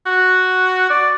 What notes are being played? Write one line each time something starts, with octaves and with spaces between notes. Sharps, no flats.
F#4
D5